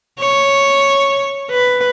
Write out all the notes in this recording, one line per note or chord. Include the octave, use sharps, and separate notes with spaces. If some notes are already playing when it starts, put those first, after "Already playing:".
C#5
B4